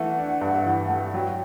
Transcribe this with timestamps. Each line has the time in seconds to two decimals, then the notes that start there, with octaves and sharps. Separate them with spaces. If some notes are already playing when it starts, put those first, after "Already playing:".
Already playing: E3 A3 F#5
0.19 D4
0.41 G2
0.65 E3
0.89 A3
1.14 F#3 G5